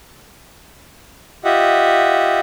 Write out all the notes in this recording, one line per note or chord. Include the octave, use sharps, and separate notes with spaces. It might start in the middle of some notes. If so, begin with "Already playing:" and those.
F4 G4 D#5 E5 F#5